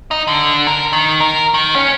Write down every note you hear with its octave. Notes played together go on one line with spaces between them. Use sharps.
D#4
D3
A#4
D#3
A#4
D#3
C#4